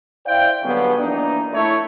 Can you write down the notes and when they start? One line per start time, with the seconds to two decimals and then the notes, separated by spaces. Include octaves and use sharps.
0.25 E4 C5 D5 F5 G5
0.63 D3 F#3 G3 B3 C#4 G#4
0.98 E3 F3 A#3 D4 D#4
1.53 A3 E4 C#5